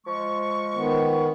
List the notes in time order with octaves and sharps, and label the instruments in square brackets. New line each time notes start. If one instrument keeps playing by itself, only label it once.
[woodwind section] F3 G#3 C#6
[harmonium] D#3 B3